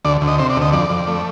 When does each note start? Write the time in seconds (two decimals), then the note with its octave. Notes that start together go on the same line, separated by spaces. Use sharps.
0.05 D2 D5
0.21 D2
0.28 D#5
0.39 C3 C5
0.50 D5
0.57 D2
0.62 D#5
0.73 F2 D5
0.90 F2
1.08 A3